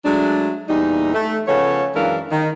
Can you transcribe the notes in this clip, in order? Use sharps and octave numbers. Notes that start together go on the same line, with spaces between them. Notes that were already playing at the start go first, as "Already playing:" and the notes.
F#3 G#3 A3 D4
E2 A#2 G3 D#4
A3
C#3 F3 B3 A4 C#5
F#2 E3 G#3 D4 A#4 F5
D#3